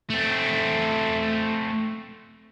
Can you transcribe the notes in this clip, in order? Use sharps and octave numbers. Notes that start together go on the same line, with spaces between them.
A3 C4